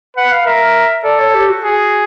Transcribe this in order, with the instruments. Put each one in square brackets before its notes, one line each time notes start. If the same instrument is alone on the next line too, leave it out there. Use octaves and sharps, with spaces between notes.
[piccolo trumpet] B4 [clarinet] F#5
[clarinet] F5
[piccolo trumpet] A#4 [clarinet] E5
[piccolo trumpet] A4 [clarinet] D5
[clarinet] C#5
G4
F#4
[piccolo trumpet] G#4